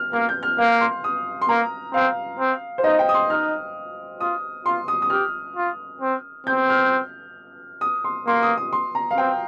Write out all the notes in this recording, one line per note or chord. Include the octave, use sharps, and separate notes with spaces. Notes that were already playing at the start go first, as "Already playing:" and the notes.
Already playing: F6
A#3 F6
G6
F6
A#3 F5
C6
D#6
C6
A#3 A#5
C4 F5
C4
C5
D#4 D#5
G5
D#6
C6
D#4 F6
F4 D#6
F4 C6
D#6
D#6
G4 F6
F4
C4
C4 G6
F6
D#6
C6
A#3 C6
D#6
D#6
C6
A#5
F5
C4 G5